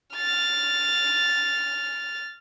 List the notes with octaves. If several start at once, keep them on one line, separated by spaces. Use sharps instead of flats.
F6 A6